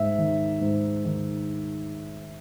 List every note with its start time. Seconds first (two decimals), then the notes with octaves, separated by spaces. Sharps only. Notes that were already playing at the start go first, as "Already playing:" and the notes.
Already playing: G#2 E5
0.18 D#3
0.61 G#2
1.05 D#3